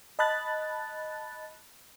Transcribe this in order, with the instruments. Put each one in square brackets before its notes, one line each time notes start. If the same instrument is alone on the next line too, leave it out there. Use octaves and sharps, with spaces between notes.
[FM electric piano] D#5 A5 B5 F#6 A6